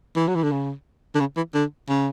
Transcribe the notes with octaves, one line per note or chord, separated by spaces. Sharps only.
E3
F#3
E3
D3
C#3
D3
C#3
E3
D3
C#3